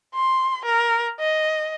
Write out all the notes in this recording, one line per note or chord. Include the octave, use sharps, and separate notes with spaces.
C6
A#4
D#5